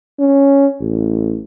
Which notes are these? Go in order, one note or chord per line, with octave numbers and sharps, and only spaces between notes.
C#4
A1